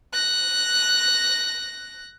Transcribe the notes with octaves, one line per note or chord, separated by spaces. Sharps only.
F#6 A#6